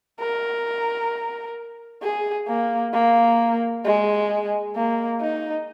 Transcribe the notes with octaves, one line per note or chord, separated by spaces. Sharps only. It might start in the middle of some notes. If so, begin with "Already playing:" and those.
A#4
G#4
A#3
A#3
G#3
A#3
D#4